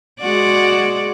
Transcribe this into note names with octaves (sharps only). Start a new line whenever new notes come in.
G#3 F#4 D5